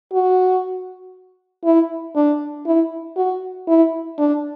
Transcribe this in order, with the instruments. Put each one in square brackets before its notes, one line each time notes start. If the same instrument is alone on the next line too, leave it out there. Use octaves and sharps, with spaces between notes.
[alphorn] F#4
E4
D4
E4
F#4
E4
D4